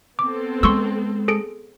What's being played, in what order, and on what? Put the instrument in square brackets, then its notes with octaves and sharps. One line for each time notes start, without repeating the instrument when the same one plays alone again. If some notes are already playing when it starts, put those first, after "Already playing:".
[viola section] B3 C4 A4 [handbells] D6
[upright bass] G#3 [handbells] C6 C#6 E6
[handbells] G#4 A4 D7